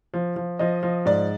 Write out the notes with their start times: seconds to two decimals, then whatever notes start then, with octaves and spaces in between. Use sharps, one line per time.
0.14 F3
0.36 F3
0.59 F3 D#5
0.83 F3
1.05 G#2 D5